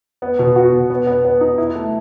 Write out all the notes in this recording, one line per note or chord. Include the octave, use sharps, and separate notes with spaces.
B3
B2
F#4
B2
B3
B3
B3
D#4
E4
A3